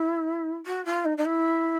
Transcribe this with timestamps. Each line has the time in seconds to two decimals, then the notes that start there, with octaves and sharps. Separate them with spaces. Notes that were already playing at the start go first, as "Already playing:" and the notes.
Already playing: E4
0.66 F#4
0.85 F4
1.05 D#4
1.17 D#4
1.25 E4